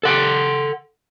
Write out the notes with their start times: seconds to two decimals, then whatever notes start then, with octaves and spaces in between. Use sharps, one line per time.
0.03 A4 F#5 G5